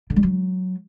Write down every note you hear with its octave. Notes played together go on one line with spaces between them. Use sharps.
D3
G3
F#3